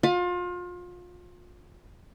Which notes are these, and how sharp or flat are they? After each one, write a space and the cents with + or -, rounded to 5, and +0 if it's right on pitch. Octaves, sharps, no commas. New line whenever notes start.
F4 +30 F5 +30